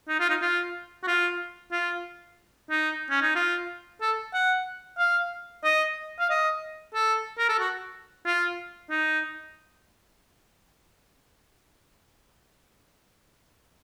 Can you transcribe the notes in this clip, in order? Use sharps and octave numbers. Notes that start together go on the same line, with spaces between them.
D#4
F4
D#4
F4
F#4
F4
F4
D#4
C#4
D#4
F4
A4
F#5
F5
D#5
F5
D#5
A4
A#4
A4
F#4
F4
D#4